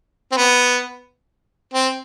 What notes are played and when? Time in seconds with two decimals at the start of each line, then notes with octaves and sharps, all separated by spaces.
0.32 C4
0.37 B3
1.74 C4